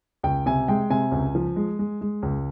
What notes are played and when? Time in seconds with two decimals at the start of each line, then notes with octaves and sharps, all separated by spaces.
0.23 C#2 G5
0.46 C3 G#5
0.68 G#3 G5
0.90 C3 G#5
1.12 C#2
1.35 F3
1.56 G#3
1.79 G#3
2.01 G#3
2.22 C#2